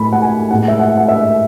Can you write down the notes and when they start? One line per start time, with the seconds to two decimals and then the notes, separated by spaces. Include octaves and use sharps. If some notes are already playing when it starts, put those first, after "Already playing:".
Already playing: A2 G#3 B5
0.13 F#5
0.22 G#5
0.51 A2 G#3 F#5
0.68 E5
0.79 F#5
0.98 F#5
1.08 E5